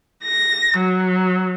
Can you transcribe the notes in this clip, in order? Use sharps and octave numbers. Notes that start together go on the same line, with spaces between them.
A#6
F#3